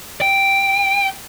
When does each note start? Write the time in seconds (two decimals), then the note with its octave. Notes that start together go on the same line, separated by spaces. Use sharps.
0.21 G5